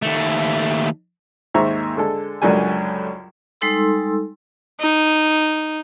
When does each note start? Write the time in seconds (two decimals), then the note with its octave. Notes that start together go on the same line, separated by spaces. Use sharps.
0.03 D#2 A3
1.54 D#2 G#2 C5 E5 A#5 C#6
1.97 D3 G#3 A4
2.42 C#2 F#2 D3 F#3 G3 G#5
3.61 G3 G#3 D#4 A4 C6 E6
4.80 D#4